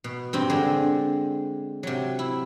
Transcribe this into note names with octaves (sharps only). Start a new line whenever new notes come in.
B2
G2 C4 G4
D3 G#3 D4
C3 F#3
E4